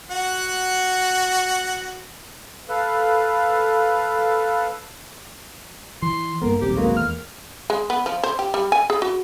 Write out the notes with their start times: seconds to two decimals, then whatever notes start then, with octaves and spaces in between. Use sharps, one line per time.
0.11 F#4 F#5
2.69 A4 B4 F5
6.02 E3 C6
6.42 G2 A#3 B3 A#4
6.61 D#1 B1 C4 G4
6.77 G#3 A#3 F#4 B4
6.97 E2 F6
7.70 G#3
7.90 B3
8.06 F3
8.23 C5
8.39 G4
8.54 G3
8.72 G#5
8.90 G#4
9.02 F#4